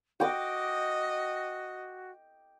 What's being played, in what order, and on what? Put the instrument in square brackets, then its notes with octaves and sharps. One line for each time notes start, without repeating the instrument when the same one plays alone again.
[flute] F#4 [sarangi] D#5 [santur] G5 D6